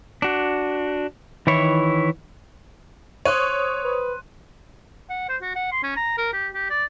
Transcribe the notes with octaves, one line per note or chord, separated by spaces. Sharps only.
D4 F#4
D#3 E3 E4 C#5
C5 C#5 C6 D#6 F#6 D#7
B4
F#5
C5
F#4
F#5
C6
C#4
A#5
A#4
G4
G4
D5